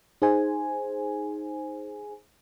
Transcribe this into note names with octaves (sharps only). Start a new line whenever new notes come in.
D#4 G#4 C5 G#5